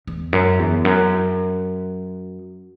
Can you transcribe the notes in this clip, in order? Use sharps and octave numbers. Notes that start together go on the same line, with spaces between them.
E2
F#2
E2
F#2